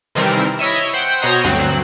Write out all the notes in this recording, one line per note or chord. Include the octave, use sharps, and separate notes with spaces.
C3 D#3 E3 G3 C4 A#4
E4 C#5 D#5 E5
C5 F#5 G5
B2 C5 C#5 D#5 A#5 D#6
D2 G2 F#3 C4 F#6